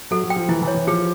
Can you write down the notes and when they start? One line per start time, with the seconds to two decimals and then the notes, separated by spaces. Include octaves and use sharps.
0.11 F#3 A4
0.24 F#3
0.30 G5
0.36 F3
0.49 E3 E4
0.62 E3
0.68 C#5
0.75 E3
0.87 F3 G#4